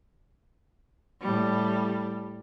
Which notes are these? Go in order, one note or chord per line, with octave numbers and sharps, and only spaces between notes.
A2 G3